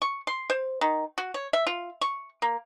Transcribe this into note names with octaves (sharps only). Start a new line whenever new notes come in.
C#6
C6
C5
D#3
F#4
C#5
E5
F4
C#6
A#3